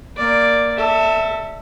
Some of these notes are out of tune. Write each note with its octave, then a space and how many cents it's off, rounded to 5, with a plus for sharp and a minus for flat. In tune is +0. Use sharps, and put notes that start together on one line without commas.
A#3 -5 D5 +0
A4 +20 E5 -10